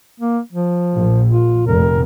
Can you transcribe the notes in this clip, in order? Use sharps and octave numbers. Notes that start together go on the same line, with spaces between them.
A#3
F3
A#1
F4
F1 A#4